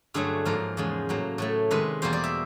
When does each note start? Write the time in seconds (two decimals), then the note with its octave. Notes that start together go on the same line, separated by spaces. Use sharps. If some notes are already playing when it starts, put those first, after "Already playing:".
0.14 G2 D3 F#3 A3 G#4
0.45 G#2 F3 A#3 A#4
0.77 E2 C#3 F3 G#3
1.09 A2 F#3 A#3
1.38 A2 F#3 A3
1.71 C3 D#3 G#3 B4
2.02 E2 B2 G3 A#3 C5
2.13 D5
2.24 E5